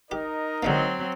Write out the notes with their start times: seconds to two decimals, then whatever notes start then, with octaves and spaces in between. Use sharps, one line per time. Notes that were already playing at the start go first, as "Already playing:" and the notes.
0.11 D#4 G4 A#4 D#5
0.63 D3 F#3 G#3 A#3 C4